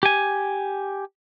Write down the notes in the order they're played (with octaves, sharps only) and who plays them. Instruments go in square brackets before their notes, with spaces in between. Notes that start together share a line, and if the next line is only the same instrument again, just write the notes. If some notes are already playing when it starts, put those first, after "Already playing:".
[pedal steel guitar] G4 G#5